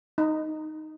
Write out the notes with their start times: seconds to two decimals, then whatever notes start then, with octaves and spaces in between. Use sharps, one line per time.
0.18 D#4